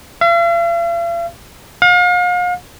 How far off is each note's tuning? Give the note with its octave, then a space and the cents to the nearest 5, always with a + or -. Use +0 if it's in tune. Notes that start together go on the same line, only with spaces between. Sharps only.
F5 -45
F5 +40